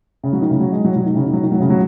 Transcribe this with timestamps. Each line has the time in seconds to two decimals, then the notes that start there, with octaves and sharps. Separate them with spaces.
0.23 C#3
0.33 F#3
0.42 D#3
0.51 C#3
0.60 F#3
0.72 G#3
0.85 F#3
0.96 F#3
1.06 D#3
1.15 C#3
1.25 D#3
1.33 F#3
1.43 D#3
1.52 F#3
1.60 C#3
1.70 F#3